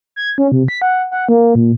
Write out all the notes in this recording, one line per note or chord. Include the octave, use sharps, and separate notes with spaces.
G#6
C#4
C3
B6
F#5
F#5
A#3
A#2